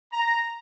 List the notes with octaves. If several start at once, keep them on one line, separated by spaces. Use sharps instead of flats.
A#5